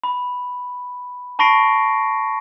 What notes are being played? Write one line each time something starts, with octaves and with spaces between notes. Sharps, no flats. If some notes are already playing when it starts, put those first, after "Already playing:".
B5
A5 B5 C#6 A#6 C7 D7